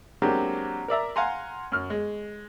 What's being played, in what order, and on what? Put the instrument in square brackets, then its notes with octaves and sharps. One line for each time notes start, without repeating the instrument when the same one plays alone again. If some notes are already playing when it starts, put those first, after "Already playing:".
[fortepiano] F#3 G#3 A#3 C4 D4 G4
A#4 D5 E5 A#5
F5 F#5 G#5 A#5 C6
F#2 F6
G#3